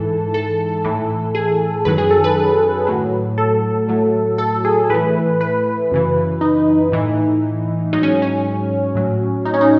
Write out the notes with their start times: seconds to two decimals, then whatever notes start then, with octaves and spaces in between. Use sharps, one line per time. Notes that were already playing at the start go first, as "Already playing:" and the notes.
Already playing: G#2 E3 A4
0.34 A4
0.85 A2 E3
1.35 G#4
1.85 F#2 D#3 F#3 B4
1.98 G#4
2.11 A4
2.24 B4
2.87 A2 F#3
3.38 A4
3.88 A2 F#3
4.38 A4
4.65 G#4
4.90 A2 E3 B4
5.41 B4
5.91 F#2 C#3 E3
6.41 D#4
6.92 A2 E3
7.93 G#2 F#3 D#4
8.03 C#4
8.22 C#4
8.95 A2 F#3
9.45 D#4
9.54 C#4
9.61 D#4